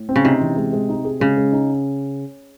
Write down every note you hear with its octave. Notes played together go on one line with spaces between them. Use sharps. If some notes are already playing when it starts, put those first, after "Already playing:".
Already playing: A2
C4
C#3
C3 D#4
E3
G#3
G#3
D#4
G#4
C#3 G#3
G#3
D#4